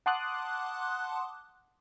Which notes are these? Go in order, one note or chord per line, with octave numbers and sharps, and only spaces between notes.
F#5 A5 C6 D6 D#6 F#6